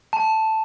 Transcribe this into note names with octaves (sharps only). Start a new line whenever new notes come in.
A5